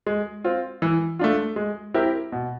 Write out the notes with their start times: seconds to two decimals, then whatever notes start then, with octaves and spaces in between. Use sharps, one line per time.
0.07 G#3
0.44 C4 F4
0.82 E3
1.19 A3 D4 F4
1.56 G#3
1.94 C4 E4 G4 A#4
2.32 B2